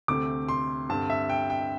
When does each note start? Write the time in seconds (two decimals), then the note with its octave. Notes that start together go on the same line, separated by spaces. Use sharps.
0.08 D2 C3 A3 C4 D6
0.49 C6
0.89 G2 D3 C4 A5
1.10 E5
1.30 G5
1.50 G5